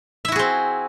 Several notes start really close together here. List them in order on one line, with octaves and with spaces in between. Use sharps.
E5 E4 F#4 G#4 C4